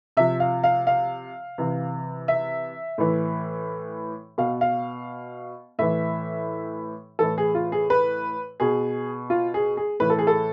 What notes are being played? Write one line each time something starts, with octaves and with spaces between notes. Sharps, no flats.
C3 F3 E5
F5
F5
F5
C3 E3
E5
A2 E3
B2 F5
F5
A2 E3 E5
A2 E3 A4
G#4
F4
G#4
B4
B2 G#4
F4
G#4
G#4
A2 E3 B4
A4
G#4
A4